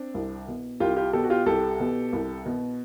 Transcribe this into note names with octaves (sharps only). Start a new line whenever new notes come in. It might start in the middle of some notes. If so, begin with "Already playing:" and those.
Already playing: C4 D4
C2
B2
C2 F4 G4
F4 G4
B2 G4 A4
F#4
F4 G4
C2 G4 A4
B2
C2
B2